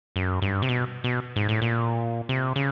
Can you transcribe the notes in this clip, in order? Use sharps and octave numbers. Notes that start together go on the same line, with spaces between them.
F#2
G2
C3
B2
B2
G#2
A2
A#2
C3
C#3